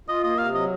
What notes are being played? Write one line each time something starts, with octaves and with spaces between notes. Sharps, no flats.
F4 D#5
A#3 D#5
C3 F5
F#3 D#5